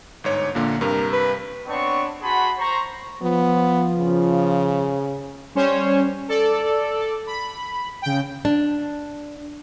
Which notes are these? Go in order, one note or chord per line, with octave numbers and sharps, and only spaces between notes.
G1 G#2 C#5
A#1 A#2 D3 A#3
G2 C3 A#4
B4
B3 C4 D4 C#5 C#6
F#4 G#4 F#5 A5 B5 C6
C5 A#5 C#6
F3 B3
C#3
G3 C#4 C5 C#5
A4 D5
B5
C#3 G5
D4